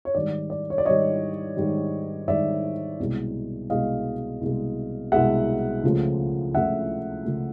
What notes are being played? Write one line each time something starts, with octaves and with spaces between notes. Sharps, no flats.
C#5
G#2 D#3 G3 D5
D5
C#5
D5
G#2 D#3 G3 C#5 D#5
G#2 D#3 G3
G#2 D#3 G3 D5 E5
C2 B2 G#3
C2 B2 G#3 D#5 F5
C2 B2 G#3
C2 B2 G#3 E5 F#5
C#2 C#3 F3 A3
C#2 C#3 F3 A3 E5 F#5
C#3 F3 A3